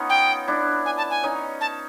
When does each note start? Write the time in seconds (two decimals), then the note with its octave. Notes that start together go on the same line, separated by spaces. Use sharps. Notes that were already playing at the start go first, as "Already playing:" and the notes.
Already playing: B3 C#4 D#4 F4
0.10 G5
0.48 D4 E4
0.86 G#5
0.98 A5
1.10 G#5
1.24 C#4 D#4
1.61 A5